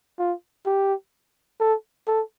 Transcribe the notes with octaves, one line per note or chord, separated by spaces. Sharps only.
F4
G4
A4
A4